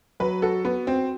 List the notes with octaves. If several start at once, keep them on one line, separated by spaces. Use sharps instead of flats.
F#3 B4
F#4 A4
B3 F#4
C4 F#4